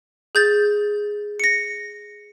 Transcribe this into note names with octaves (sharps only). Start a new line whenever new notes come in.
G#4 G6 A6
A#6 C#7